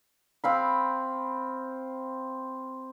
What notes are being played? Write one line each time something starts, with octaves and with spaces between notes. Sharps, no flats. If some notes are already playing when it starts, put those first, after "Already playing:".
C4 F5 B5